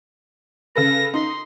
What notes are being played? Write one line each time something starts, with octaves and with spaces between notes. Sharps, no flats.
C#3 A4 B4 A#6
D#4 C6